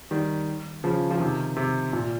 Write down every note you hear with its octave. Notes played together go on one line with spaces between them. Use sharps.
D#3 G3
C#3 F3
F3
C3 D#3
C3
A#2